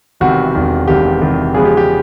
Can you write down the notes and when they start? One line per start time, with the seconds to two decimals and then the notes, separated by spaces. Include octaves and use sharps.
0.20 E1 E2 C3 D#3 F#4
0.55 E1 E2 C3 D#3
0.88 E1 E2 C3 D#3 G4
1.21 E1 E2 C3 D#3
1.54 E2 C#3 F3 G#3 B3 G#4
1.65 G4
1.77 G4